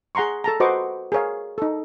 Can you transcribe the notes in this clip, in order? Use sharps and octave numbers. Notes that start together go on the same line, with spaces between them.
G#4 F#5 A#5 C6 C#6
A4 A5 A#5
F#4 B4 C5 D#5 C#6 D6
G#4 A#4 C#5 F5
D#4 A4